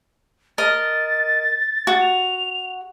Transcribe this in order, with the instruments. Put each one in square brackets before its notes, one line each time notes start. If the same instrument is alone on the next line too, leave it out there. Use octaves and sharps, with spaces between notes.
[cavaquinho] A#4 D#5 [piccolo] A6
[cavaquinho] F#4
[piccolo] F7